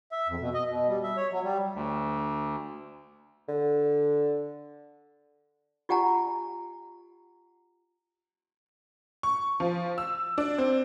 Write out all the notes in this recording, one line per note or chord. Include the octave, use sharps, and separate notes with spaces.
E5
F2
B2
D#5
B2
G3
E5
C#5
F#3
G3
D2
D3
F4 G4 F#5 G#5 A#5
C#6
F3
E6
D4
C4